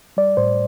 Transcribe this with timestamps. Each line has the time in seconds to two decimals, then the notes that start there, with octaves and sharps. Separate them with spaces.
0.17 G3 D5
0.37 A2 C5